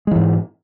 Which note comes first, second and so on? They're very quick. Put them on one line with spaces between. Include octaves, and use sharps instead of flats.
G#3 E3 G#2